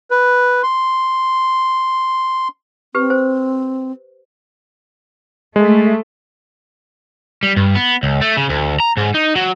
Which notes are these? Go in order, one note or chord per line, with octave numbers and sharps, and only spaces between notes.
B4
C6
C4 G4 B4
C5
G#3 A3
G3
G2
B3
C#2
A3
C#3
D2
A#5
G#2
D#4
F#3